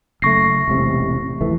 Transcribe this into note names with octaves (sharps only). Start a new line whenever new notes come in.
F#1 A3 C#6 A#6 C7
E1 A1 C3
F2 E3 A3